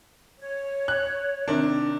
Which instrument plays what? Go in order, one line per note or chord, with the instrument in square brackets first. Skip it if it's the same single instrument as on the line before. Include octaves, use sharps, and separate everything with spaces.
[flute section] C#5
[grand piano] F#6
C3 D#3 D4